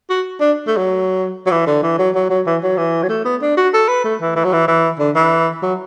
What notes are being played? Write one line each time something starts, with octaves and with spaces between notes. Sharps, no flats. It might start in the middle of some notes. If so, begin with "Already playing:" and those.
F#4
D4
A3
F#3
F#3
E3
D3
E3
F#3
F#3
F#3
E3
F#3
E3
F#3
A3
B3
D4
F#4
A4
B4
A3
E3
E3
F#3
E3
E3
D3
E3
F#3